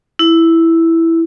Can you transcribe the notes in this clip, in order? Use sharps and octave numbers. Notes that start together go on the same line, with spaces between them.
E4